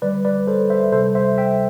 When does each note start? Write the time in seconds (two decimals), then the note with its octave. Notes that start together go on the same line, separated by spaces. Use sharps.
0.02 D3 G3 B4 D5
0.25 B4 D5
0.47 A4 C5
0.70 C5 E5
0.92 C3 G3 A4 C5
1.15 C5 E5
1.38 E5 G5